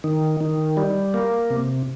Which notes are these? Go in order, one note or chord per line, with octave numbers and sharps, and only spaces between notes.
D#3
D#3
G3
A#3
C3